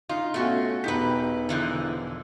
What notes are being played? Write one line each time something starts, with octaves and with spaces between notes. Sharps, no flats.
D#4 F4
B2 A3 C#4 F#4
E1 D#4 G4 B4 B6
D3 E3 F3